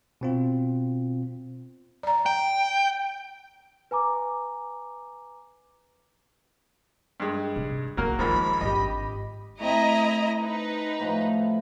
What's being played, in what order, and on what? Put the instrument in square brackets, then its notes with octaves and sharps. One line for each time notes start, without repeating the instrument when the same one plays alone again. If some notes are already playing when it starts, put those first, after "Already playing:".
[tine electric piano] B2 C4 F4
[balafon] D5 A#5
[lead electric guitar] G5
[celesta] B4 G#5 A#5 D6
[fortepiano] G2 G#3
[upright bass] C3
[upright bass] E3 B3 [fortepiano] F#3 A#3 A#4
[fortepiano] D#2 G#2 F3 [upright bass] G#3 [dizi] B5
[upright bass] G#1 D4 [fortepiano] G4 D#5
[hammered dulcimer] A3 C4 [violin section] E4 D#5 A#5
[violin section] D#4 B4
[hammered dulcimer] A2 F3